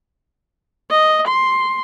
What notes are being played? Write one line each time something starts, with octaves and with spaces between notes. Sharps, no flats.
D#5
C6